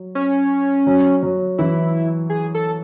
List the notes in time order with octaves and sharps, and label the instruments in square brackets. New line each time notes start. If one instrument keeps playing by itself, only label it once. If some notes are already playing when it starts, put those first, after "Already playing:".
Already playing: [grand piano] F#3
[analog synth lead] C#4
[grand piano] F#3
F#3
[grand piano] E3 [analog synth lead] E4
[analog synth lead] G#4
A4